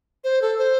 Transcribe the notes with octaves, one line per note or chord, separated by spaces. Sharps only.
C5
A4
C5